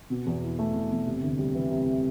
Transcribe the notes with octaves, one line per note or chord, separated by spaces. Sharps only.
B2
E2
E4
A3
B2
E2
C3
D2
G3
E3
C3